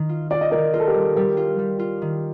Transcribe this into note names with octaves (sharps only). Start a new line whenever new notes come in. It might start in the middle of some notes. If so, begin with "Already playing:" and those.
Already playing: D#3
F4
F4 D5
D#5
D#3 A#4 D5
F4 A#4
A4
G4 A#4
G3
G3 G4 A#4
F4
G3
F4
D#3